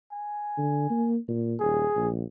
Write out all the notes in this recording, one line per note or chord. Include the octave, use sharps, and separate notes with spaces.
G#5
D3
A#3
A#2
D#1 G#4
A#1